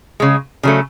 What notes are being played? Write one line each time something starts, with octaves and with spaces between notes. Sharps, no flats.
C#3 G#3
C#3 F#3 A3